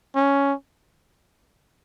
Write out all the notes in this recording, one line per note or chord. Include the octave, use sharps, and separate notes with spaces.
C#4